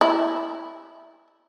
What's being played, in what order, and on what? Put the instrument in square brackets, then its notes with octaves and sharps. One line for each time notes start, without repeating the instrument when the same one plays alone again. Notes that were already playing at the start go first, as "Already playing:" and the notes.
[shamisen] E4